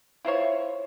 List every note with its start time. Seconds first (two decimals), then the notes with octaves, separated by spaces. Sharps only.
0.25 E4 F4 C5 C#5